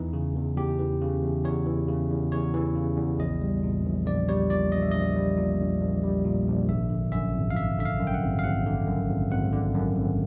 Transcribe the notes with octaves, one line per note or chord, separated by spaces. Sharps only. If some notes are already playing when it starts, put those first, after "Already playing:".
Already playing: E2 E3 D#4
C#3
E2
E2 G4
E3
C#3
E2
E2 C#5
E3
C#3
E2
E2 C#5
E3
C#3
E2
A#1 D#5
G3
A#2
A#1
A#1 D5
G3 C#5
A#2 D5
A#1 D#5
E5
A#1 D#5
G3
A#2
A#1
A#1
G3
A#2
A#1
G#1 E5
D3
F#2 E5
G#1
F5
G#1 E5
D3 E5
F5
F#2
G5
F#5
G#1
F5
G#1 F#5
D3
F#2
G#1
G#1 F#5
D3
F#2
G#1